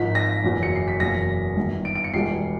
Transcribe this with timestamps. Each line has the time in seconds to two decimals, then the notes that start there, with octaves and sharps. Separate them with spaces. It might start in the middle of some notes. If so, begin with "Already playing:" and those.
Already playing: G#1 G#2 F3 B6
0.15 A#6
0.44 F#1 E2 B2 F#3
0.63 C#7
0.75 C7
0.88 B6
1.00 F#1 E2 B2 F#3 A#6
1.57 G1 G2 D#3
1.85 D7
1.95 D7
2.04 C#7
2.14 E1 E2 B2 G3 C7